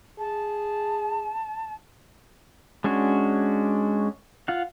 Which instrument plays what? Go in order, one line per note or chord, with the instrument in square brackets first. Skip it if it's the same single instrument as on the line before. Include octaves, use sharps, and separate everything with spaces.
[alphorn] G#4 [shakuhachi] A5
[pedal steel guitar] G#3 C#4 D4 F#4
F4 F5 F#5